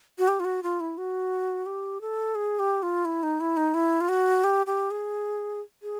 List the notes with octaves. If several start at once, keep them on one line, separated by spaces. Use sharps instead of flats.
F#4
G4
F4
F#4
F4
E4
F#4
G4
A4
G#4
G4
F4
E4
D#4
E4
D#4
E4
F4
F#4
G4
G4
G#4
G#4